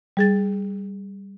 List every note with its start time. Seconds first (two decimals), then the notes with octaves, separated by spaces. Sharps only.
0.17 G3 G#4 A6